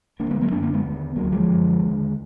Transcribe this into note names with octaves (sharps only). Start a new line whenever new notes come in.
D2 D3 A#3 D4
G#3 B3
F#3 A#3
F#2 D3 A#3 D4
A#3 D4
G#3 B3
D#2 D3
D2 D3 F#3 A#3
F3 G#3
F#2 D3
D#2 D3